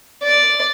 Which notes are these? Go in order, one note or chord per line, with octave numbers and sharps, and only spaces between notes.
D5